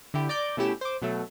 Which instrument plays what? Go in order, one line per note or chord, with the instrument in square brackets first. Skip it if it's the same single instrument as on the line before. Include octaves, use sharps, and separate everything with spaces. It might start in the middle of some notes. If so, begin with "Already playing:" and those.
[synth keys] D3 E4 G4
D5 A#5 D6 G6
B2 A3 C#4 E4 G4 E7
C5 D6
B2 F#3 A3